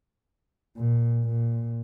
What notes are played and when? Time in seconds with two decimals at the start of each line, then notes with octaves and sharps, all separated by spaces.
0.77 A#2
1.24 A#2